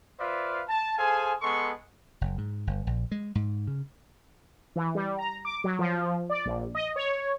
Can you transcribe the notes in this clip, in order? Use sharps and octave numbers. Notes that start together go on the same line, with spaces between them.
F4 B4 C5 D5 E5 F5
A5
G#4 A4 C5 F5 G#5
G#3 B3 A4 C6 C#6
F#1
G#2
G1
A#1
G#3
G#2
C#3
E3
G3
A#5
D6
F#3
F3
D5
A#1
D#5
C#5